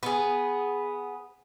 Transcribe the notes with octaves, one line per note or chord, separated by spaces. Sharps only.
B3 G#4